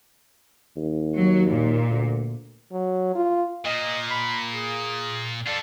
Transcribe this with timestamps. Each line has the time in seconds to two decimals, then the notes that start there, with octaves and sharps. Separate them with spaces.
0.76 D#2
1.16 F#3
1.51 A#2
1.90 D2
2.72 F#3
3.15 F4
3.65 A#2 D#5
4.10 B5
4.51 G#4
5.47 F4 A4 D5